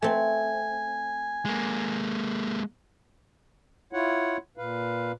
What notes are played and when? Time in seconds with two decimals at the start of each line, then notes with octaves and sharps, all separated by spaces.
0.02 A3 C4 G#5
1.45 G#3 A#3
3.93 E4 F4 C#5 F#5
4.57 A#2 B4 F5